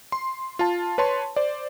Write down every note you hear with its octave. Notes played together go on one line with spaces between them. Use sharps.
C6
F4 A5
B4 C#5 A5 C6
C5 D5